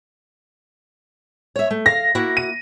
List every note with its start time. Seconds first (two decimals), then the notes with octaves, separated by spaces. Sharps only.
1.56 C#5 E5
1.70 A3
1.86 F5 A#6
2.15 A#3 E4 F#4
2.37 D#7